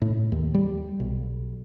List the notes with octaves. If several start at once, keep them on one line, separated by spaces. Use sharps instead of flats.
A2
D#2
G3
B1